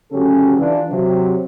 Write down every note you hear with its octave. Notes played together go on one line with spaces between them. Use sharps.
D2 C#3 F#3 C#4 G4 A4
E3 D4 F4
C3 F#3